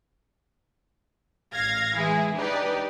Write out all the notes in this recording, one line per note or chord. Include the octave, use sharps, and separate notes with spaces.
A1 F5 G#6 A#6
E3 G#3 E4 G#4
D4 D#4 G4 B4 D5